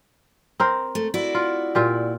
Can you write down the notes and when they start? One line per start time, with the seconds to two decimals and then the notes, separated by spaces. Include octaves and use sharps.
0.60 C4 A#4 C5
0.95 A3
1.14 E4 F#4 D5
1.35 F4
1.75 A#2 F4 G4